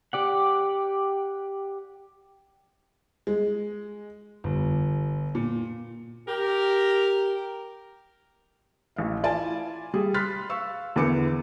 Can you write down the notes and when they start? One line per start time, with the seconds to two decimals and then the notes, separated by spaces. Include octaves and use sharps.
0.13 G4 D5 F#5
3.27 G#3
4.44 G1
5.35 A#2
6.27 G4 A#4
8.96 A1 F5
9.23 E4 F4 D5 G#5 A5
9.94 G3 G#4
10.14 B5 C6 F6 F#6 A6 B6
10.50 F5 C#6 E6
10.96 E2 D3 B3 A#4 D6 C#7